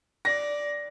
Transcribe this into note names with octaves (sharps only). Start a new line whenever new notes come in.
D5 A#6